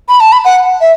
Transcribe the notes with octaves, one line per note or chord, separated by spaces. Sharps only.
B5
A5
B5
F#5
E5